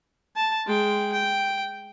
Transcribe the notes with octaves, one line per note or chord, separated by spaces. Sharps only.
A5
G#3 G5
G5